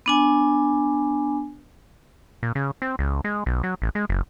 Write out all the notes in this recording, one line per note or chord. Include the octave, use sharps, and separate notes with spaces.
B3 D4 G#5
A#2
C#3
C4
C#2
G#3
B1
F#3
A1
G#3
F#1